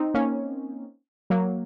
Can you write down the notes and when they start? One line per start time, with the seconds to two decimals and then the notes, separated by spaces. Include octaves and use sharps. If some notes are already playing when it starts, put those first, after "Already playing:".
Already playing: C4 D#4
0.14 A#3 C#4
1.30 F#3 A#3